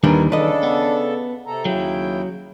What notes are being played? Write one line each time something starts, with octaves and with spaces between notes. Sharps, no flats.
D#2 D#3 E3 G3 D4 A#4 B4 G#5
C#3 D4 A4 B4 D#5
B3
C3 A4 A#5
D#2 C#3 F#3 E4 G5